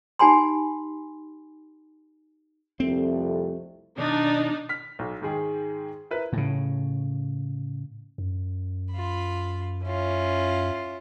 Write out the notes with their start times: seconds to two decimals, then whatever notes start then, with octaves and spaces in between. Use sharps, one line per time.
0.19 D#4 G4 G#5 B5 C6
2.80 C2 F2 A3 C4
3.98 B2 D#3 D4 D#4
4.69 F6 B6
4.99 B1
5.22 G#2 D#3 G#3 G#4 G5
6.11 E4 A#4 B4
6.33 A2 C#3
8.18 F#2
8.92 F4 B5
9.85 C#4 E4 F4